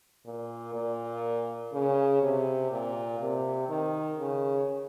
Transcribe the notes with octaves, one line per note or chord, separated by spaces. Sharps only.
A#2
A#2
C#3
C3
A#2
C3
D#3
C#3